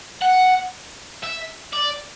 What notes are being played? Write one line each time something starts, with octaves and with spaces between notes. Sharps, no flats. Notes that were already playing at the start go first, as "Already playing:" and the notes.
F#5
E5
D5